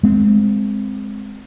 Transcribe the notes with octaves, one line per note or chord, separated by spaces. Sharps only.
G#3 C4